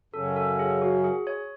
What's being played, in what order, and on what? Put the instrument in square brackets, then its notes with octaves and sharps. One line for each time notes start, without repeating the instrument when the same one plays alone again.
[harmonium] F#2 C#3 F#3 C#4 [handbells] A4
[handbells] A4
G#4
F#4
G#4
C#5